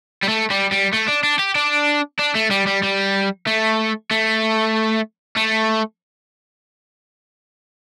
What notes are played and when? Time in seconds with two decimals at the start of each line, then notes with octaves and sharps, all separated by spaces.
0.23 G3
0.28 A3
0.50 G3
0.71 G3
0.93 A3
1.07 D4
1.23 D4
1.39 G4
1.56 D4
2.19 D4
2.35 A3
2.51 G3
2.67 G3
2.82 G3
3.47 A3
4.11 A3
5.37 A3